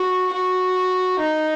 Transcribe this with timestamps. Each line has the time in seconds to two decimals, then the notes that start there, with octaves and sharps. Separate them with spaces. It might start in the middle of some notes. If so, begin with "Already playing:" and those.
Already playing: F#4
0.34 F#4
1.19 D#4